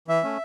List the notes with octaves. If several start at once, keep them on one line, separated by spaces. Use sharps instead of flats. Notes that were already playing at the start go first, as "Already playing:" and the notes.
E3 E5
A3 C#4